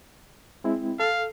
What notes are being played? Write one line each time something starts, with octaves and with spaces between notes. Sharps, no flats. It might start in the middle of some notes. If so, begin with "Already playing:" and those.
G#3 C4 E4
A4 F5